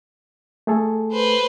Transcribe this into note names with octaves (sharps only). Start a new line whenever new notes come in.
A3 G#4 A4
B4 C5